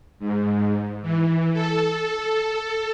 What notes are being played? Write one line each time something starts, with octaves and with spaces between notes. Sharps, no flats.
G#2
E3
A4